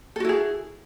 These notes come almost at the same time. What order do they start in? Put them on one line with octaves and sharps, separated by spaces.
A4 F#4 E4 G#4